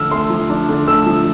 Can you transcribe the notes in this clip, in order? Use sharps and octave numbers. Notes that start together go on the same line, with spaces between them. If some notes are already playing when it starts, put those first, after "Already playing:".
Already playing: D3 F3 A3 D4 E6 F6
A3 C6
F3
D4
D3
A3 E6
F3